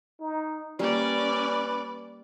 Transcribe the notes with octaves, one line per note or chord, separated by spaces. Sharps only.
D#4
G3 A#3 C#4 B4 D5